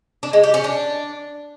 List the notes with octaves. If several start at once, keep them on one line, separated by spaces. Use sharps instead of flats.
D4
G#3
G4
C#4
D4